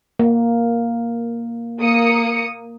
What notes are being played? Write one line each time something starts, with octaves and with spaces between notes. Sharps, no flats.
A#3
A#3 D#6 C#7